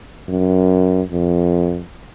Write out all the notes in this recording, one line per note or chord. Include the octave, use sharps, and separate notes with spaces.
F#2
F2